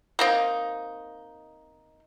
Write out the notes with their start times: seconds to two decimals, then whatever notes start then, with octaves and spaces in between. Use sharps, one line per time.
0.19 A#3 C4 D#4